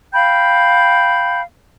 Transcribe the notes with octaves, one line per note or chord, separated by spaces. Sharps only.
F5 G5 B5 G6